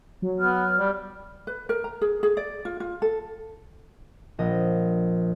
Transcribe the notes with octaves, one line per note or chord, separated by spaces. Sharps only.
F#3
B3 F6
G3
B4
A#4
A#5
G#4
G#4
D5
F4
F4
A4
A#1 D#5